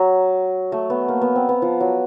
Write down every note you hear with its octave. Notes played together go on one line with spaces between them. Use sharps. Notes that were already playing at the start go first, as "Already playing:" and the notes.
Already playing: F#3
A3
B3
A#3
B3
C4
B3
F3
F#3